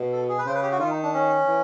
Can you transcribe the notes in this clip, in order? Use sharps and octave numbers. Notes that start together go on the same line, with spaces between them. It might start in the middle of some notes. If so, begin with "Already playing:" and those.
Already playing: B2
A4
G#4
B4
C#3 C5
B4
G4
F#4
D#3 F4
D#4
D4
C#4
E3